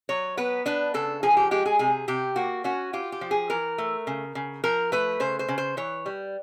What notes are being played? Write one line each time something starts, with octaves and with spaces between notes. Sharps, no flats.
F#3 C#5
B3 B4
D4 B4
C#3 A4
F3 G#4
G4
G#3 G4
G#4
C3 G#4
C3 G4
A#3 F#4
C#4 F#4
F4 G4
G4
F3
G#4
E3 A#4
A3
C#3
C#3
F3 A#4
A3 B4
C#3 C5
C5
C#3
C5
E3 C#5
G3